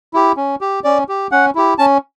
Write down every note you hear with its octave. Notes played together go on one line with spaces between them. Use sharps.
E4 G4
C#4
G4
C#4 D5
G4
C#4 F#5
E4 G4
C#4 A5